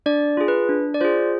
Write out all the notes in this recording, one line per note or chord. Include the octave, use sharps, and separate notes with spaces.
D4 D5
F4 G#4
B4
D4
D5
F4 G#4 C5